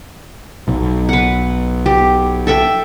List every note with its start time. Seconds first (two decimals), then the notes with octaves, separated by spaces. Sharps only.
0.68 B1
1.09 B4 F#5
1.86 G4
2.47 A4 E5 G5